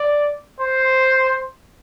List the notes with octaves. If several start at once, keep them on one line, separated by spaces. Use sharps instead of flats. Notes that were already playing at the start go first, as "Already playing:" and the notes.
Already playing: D5
C5